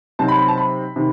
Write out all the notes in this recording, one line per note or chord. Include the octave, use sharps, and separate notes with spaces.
C3 F#3 C4 D#4 A5
B5
B5
A5
B5
C3 D#3